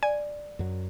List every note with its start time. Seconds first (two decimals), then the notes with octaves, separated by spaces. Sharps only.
0.03 D5 G#5
0.59 F#2 F#3